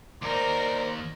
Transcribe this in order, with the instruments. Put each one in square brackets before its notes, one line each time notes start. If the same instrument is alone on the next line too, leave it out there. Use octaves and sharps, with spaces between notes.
[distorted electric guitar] D#2 D#4 [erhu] A#4 [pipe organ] C5 D5